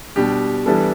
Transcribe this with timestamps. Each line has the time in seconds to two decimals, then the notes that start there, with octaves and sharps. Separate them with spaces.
0.16 B2 G3 D4 G4
0.66 E3 G3 B3 D4 A4